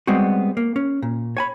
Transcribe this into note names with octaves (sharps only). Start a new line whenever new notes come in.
G3 G#3 B3 C4 F#4
A#3
C#4
A#2
C#5 G#5 B5